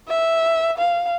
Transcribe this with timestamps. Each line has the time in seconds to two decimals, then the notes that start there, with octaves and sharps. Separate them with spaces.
0.08 E5
0.78 F5